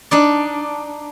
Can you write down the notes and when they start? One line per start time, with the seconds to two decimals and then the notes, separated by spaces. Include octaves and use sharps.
0.11 D4 D#4 D5